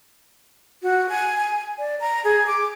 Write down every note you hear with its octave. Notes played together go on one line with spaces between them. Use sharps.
F#4
G#5
G#5
D5
A#5
G#4
D6